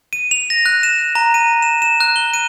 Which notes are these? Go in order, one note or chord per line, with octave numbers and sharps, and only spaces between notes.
D#7
F7
A#6
F#6
E7
A#5
D#7
E7
E7
F#6
G7
D#7